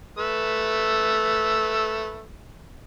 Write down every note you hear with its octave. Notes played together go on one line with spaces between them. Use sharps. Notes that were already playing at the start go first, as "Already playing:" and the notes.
A3 B4 E6